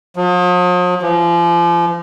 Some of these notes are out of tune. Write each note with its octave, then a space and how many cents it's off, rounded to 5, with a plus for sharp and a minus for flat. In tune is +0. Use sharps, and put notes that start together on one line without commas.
F3 +45
F3 -35